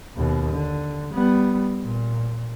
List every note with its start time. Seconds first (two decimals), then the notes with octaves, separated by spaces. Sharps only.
0.17 D#2 B2
0.50 D3
1.14 G3 B3
1.82 A#2